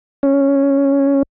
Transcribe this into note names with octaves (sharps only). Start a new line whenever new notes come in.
C#4